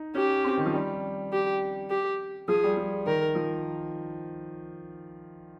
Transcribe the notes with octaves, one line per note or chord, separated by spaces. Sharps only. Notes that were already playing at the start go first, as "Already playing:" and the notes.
Already playing: D#4
C#4 G4
C4
D#3
F3
G3
G4
G4
F3 G#4
G3
F3
D#3 A#4
F3